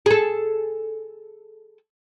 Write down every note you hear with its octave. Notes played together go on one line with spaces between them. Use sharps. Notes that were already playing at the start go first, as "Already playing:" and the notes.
G#4 A4